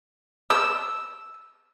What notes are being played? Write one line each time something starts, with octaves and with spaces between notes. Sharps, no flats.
E6